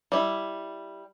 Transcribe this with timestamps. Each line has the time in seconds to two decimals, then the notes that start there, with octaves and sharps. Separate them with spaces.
0.12 G3 E4